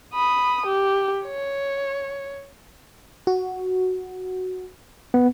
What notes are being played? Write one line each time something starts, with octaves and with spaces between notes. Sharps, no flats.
B5 D#6
G4
C#5
F#4
B3